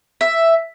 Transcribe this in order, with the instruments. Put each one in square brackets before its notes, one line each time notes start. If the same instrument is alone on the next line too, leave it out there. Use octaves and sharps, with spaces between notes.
[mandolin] E5